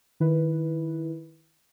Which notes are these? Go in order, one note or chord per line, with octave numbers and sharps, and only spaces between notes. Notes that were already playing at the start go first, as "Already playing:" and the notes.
D#3 E4 B4